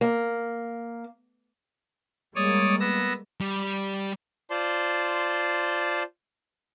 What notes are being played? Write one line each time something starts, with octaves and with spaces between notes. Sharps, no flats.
A#3
G3 G#3 A#3 C#5 D5 D#6
B3 E6 A#6
G3
F4 C5 D5 A5 C6